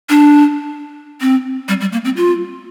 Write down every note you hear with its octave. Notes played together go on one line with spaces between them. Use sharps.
D4
C4
G3
G3
A#3
C4
F4